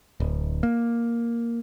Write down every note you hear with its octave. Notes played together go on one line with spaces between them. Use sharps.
D1
A#3